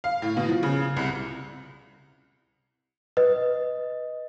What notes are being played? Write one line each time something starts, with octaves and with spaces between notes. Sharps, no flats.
F5
A2
B2
F3
C#3
C2
B4 D#5